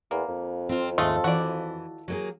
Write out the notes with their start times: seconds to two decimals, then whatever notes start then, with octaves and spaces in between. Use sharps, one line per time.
0.11 E2 A#3
0.28 F2
0.69 C4 F4
0.98 D#2 G#2 G#3 A3 F4 A4
1.24 E3 F#4 D5
2.08 F#3 A#3 G#4